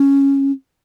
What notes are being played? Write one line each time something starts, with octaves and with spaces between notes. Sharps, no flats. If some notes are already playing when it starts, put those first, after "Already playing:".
Already playing: C#4